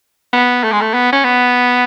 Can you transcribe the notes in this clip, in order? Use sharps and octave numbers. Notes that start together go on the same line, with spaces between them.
B3
A3
G#3
A3
B3
C#4
B3